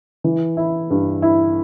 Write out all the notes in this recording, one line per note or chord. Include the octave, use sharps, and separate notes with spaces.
E3
E4
G2
E4